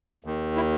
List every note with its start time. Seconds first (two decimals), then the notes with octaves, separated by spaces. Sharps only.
0.24 D#2 D#3
0.56 E4